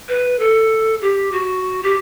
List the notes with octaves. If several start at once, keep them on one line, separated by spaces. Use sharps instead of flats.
B4
A4
G4
F#4
G4